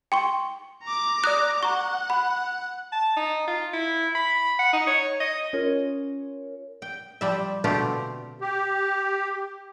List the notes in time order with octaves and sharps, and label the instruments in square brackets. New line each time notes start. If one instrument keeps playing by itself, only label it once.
[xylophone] G5 C6 C#6
[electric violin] A#5 D6
[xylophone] D5 D#6 F#6
[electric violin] F#5 [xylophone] A#5 C#6
[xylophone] B5
[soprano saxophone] A5
D#4
F4
E4
B5
F#5
D#4
C#5
D#5
[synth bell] C#4 F4 A#4 C#5
[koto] G5
F3 G3 E5
B2 D3 A3 C4 F4 G4
[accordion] G4